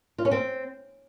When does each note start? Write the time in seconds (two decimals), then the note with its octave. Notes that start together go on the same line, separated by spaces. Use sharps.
0.18 F4
0.25 C#4
0.31 C4